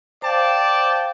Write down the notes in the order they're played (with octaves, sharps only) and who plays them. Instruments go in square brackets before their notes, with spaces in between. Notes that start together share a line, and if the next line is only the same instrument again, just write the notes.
[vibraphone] C5 F5 [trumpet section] D5 G5 A5